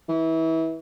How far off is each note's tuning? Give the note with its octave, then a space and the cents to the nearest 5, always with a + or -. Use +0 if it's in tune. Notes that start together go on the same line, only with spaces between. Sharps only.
E3 -25